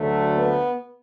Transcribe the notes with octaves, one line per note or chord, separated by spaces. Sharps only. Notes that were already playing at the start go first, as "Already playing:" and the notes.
Already playing: D2 D3 F#3 A3
B3